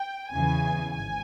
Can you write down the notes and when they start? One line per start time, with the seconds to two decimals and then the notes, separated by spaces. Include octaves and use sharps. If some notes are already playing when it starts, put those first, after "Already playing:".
Already playing: G5
0.31 E2 C#3 E3 G#5
0.93 G#1 G#5